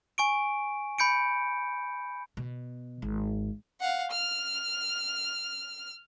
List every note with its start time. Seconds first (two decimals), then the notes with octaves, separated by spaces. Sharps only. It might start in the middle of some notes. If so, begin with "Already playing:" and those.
0.18 G#5 C#6 D7
0.99 B5 G6 C#7 D7
2.37 B2
3.02 G#1
3.80 F5 F#5
4.12 F6